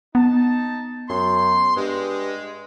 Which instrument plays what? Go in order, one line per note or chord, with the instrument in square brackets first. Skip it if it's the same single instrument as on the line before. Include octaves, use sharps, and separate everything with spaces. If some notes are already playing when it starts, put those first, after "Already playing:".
[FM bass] B3 [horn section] D#4 A5
[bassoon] F#2 [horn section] C6
[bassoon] G2 [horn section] G#3